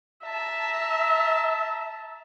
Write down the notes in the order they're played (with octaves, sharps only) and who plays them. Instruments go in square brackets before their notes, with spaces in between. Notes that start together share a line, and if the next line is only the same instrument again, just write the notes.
[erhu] E5 [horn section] A5 A#5